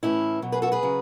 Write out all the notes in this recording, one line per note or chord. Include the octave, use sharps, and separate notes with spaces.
A2 E3 C#4 E4
B2 F#3
G#4 B4
F#4 A4
G#4 B4
C#3 F#3